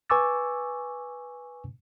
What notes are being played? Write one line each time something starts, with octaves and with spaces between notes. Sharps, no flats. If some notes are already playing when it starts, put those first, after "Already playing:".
B4 G#5 C#6 D6 E6 A6